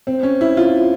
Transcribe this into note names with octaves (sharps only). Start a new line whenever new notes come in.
C4
C#4
E4
F4